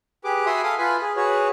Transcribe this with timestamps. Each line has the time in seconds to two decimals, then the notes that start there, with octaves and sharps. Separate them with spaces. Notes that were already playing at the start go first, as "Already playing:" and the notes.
0.24 G4 G#4 B4 D6
0.46 F#4 E5 G#5 B5 C6 D#6
0.63 A4 F5 G#5 D#6
0.79 F4 B4 G#5 B5
1.02 G#4
1.16 F#4 G#4 B4 C#5